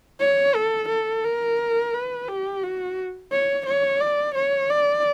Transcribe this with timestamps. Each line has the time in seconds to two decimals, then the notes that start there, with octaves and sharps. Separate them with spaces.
0.20 C#5
0.55 A4
0.89 A4
1.24 A#4
1.94 B4
2.28 G4
2.63 F#4
3.32 C#5
3.66 C#5
4.01 D5
4.35 C#5
4.70 D5